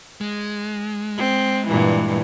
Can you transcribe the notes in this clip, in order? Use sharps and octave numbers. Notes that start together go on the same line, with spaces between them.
G#3
C4
G2 A#2 E3